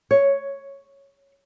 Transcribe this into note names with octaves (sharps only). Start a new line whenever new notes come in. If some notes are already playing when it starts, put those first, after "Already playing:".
C#5